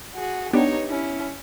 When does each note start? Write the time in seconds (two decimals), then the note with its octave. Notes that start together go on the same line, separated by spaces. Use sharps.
0.15 F#4 G#4
0.53 B3 D4 D#4 G4 C#5
0.88 C#4 E4